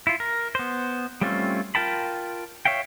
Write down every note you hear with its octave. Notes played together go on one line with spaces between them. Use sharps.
E4 F4
A#4
B3 C5
G3 A3 C4 C#4 F4
F4 A#4 G5 A5 B5
C#5 E5 F5 G5